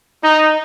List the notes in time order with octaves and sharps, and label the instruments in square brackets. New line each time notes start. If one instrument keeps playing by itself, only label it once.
[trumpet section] D#4